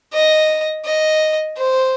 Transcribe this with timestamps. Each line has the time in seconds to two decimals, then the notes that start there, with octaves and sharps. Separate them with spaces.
0.13 D#5
0.85 D#5
1.57 C5